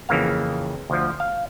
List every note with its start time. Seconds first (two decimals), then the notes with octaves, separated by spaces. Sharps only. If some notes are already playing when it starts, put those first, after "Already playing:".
0.09 F2 C#3 E3 A#3 F5
0.90 D2 F3
1.20 F5